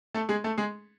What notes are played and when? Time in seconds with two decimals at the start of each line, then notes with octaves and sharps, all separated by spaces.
0.14 A3 A4
0.29 G#3 G#4
0.44 A3 A4
0.58 G#3 G#4